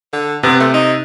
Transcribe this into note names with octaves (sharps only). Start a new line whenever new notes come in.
D3
C3 B3 C4
A3
D#4